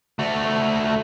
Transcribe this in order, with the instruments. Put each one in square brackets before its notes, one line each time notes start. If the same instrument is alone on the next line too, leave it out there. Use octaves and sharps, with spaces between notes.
[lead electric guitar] A3 F#4